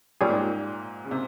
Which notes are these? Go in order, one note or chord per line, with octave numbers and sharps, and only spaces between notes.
A#2 G3 C#4 G#4
G#2
A#2
C#3
C3